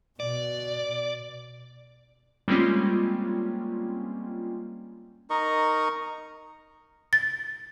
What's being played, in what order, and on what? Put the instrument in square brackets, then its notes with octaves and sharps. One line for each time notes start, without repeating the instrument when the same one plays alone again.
[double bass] B2 [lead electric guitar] D5
[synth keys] G3 G#3 A#3 C4 C#4 F4
[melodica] D#4 A#4 D#5 C#6
[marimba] A6